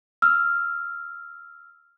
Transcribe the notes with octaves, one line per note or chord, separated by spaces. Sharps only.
E6 F6